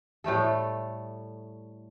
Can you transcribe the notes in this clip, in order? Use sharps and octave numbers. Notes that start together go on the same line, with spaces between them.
A2 G3 A3 A4